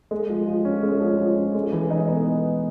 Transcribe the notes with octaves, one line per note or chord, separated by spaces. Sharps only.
G#3
F3
F3
C#4
G#3
F3
F3
C#4
G#3
E3
D#4
B3